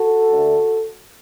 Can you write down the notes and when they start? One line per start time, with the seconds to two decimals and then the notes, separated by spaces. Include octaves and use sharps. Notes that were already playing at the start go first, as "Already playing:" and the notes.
Already playing: F#4 A4
0.30 D2 D3 A3